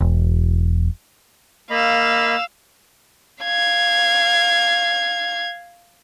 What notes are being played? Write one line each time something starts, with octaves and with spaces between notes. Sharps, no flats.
E1
A#3 D#5 F5 B5 E6
F5 G#6